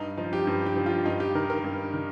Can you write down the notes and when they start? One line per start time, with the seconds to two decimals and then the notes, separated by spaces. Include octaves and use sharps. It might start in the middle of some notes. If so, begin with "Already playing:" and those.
Already playing: G2 D#4
0.17 F3 D#4
0.33 G4
0.47 G2
0.66 G4
0.76 F3
0.86 F4
1.06 G2 D#4
1.20 G4
1.35 D#3 A#4
1.50 A#4
1.64 G2
1.93 D#3